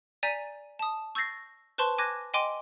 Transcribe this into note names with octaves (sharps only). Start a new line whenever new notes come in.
D5 G#5 A#5 G6 B6 D#7
A5 D#6
C#6 E6 G6 A6 A#6 C7
B4 C5 A5 C6 C#6
G#5 D6 F#6 G#6 A#6
D#5 G5 G#5 C6 D6